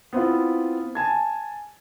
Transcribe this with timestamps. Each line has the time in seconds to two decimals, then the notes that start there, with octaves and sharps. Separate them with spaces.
0.13 B3 C4 E4 F4
0.95 G#5 A5 G#6